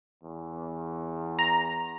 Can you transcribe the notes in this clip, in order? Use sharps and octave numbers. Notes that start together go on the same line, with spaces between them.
E2
A#5